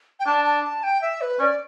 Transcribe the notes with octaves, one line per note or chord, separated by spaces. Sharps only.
G5
D4 A5
A5
A5
G5
E5
B4
C#4 D5